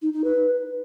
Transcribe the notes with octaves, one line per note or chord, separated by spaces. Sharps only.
D#4
D#4
B4